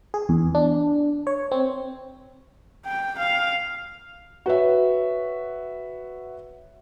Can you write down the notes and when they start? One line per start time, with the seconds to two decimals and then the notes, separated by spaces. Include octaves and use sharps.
0.14 G#4
0.29 E2
0.55 D4
1.27 C#5
1.52 C4
2.86 G5
3.19 F5
4.46 F#4 B4 C#5 E5